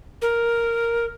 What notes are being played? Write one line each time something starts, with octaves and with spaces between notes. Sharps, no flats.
A#4